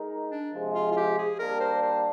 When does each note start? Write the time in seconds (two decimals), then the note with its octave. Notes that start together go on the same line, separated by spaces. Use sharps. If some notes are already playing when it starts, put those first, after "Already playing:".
Already playing: G#3 D#4 A#4
0.31 D4
0.54 C3 F3 G#3
0.75 F4
0.92 F4
0.97 G4
1.18 G#4
1.39 G3 A#3 D4 A#4
1.61 C5
1.82 C5